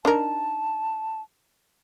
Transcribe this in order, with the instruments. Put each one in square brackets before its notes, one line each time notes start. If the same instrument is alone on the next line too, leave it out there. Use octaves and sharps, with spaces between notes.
[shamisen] D4 D#4 A#4 [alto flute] A5